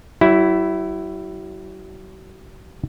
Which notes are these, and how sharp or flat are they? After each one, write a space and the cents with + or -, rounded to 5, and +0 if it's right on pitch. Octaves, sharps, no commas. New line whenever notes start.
F#3 +40 E4 +0